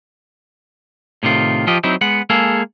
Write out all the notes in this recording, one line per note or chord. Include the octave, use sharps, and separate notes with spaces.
A2 C3 D#3 F4
F3 F4 G4 D#5
F#3 C4 D#4 E4
G#3 B3 F#5
G#3 A#3 G#4 A4